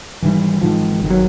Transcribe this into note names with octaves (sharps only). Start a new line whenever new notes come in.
G#2 D#3 E3 G3
G#2 D#3 F3 G#3
G1 F#2 D#3
F#3